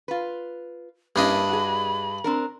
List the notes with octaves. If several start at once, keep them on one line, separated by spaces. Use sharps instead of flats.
F4 B4
G2 A#3 C#4 D4 E4 D#5 B5
F#4 G#4
C4 D4 A#4